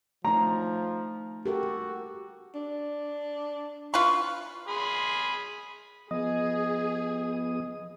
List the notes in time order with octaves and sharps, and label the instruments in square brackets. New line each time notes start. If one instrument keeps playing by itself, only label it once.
[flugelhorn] F3 [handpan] A3 D#4 [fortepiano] A#5
[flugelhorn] F#4 [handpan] G4 A4 A#4
[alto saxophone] D4
[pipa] F4 B4 [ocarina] C#6
[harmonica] G#4 B5 C6
[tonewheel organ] F3 B3 D#6 [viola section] G#4 [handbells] D#5